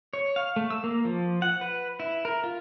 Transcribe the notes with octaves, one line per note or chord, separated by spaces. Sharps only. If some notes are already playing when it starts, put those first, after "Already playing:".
C#5
F5
A3
E6
A#3
F3
F#5
B4
E4
A#4
F4